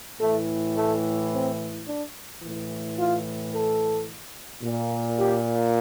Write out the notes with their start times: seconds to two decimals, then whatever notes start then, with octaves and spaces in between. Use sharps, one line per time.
0.20 A2 E3 A3
0.75 A3
1.31 C4
1.86 D4
2.41 A2 E3
2.97 F4
3.52 A4
4.62 A#2
5.18 G4